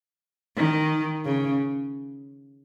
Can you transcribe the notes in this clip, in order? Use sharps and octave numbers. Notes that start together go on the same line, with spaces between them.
D#3
C#3